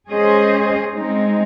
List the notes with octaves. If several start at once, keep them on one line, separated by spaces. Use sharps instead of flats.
G#3 C#4 G#4 C5 D#5
G#3 C4 D#4